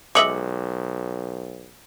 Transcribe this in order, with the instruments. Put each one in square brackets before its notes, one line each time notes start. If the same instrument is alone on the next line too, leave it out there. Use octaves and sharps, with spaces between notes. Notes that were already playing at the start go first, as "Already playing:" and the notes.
[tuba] B1 [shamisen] G#3 D#5 E5 [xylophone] D6 C#7 F#7